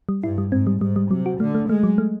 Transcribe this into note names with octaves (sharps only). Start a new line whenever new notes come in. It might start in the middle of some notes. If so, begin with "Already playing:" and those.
G3
G2 E4
G3
G#2 C4
G3
G#2 G3
G3
C3 F#3
F#4
D3 A3
A3
G#3 A3
F#3
A3